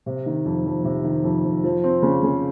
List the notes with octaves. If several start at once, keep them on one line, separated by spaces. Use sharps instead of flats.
C3
D#3
F2
F2
C3
D#3
F2
F2
F3
C4
C#3
C#3